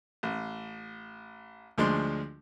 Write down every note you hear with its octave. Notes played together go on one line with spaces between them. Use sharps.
A1
D2 F3 G#3 D4 C6